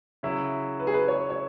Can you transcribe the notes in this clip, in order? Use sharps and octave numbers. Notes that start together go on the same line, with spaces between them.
C#3 F#3 E4 E5
B4
G#4
B4
C#5
C#5